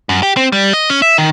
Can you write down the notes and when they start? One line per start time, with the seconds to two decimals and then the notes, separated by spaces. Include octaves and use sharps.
0.09 F#2
0.23 G4
0.37 C4
0.52 G3
0.73 D#5
0.90 C#4
1.02 E5
1.18 D#3